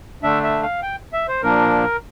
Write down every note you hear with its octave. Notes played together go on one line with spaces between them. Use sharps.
D3 A3 D4 E5
E5
F5
G5
E5
C5
A#2 F3 A#3 D4 A#4